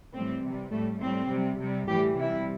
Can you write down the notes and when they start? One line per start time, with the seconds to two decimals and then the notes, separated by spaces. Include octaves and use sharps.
0.14 A2 E3 G3 C4
0.44 C3 G3
0.72 A2 G3 A3
1.02 A2 G3 C4
1.30 C3 G3
1.60 C3 G3
1.88 A2 E3 G3 G4
2.19 C3 G3 E4